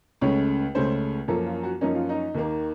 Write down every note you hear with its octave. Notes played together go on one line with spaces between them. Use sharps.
C#2 C#3 A3 C#4 C#5
C#2 C#3 A3 C#4 C5
F#2 F3 A#3 C#4 A4
F4
F#4
F#2 F3 A#3 C#4 D#4
F4
D#4
D#2 D#3 A#3